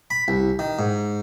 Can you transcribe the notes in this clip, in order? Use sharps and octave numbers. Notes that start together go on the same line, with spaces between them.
B5
C2
D#3
G#2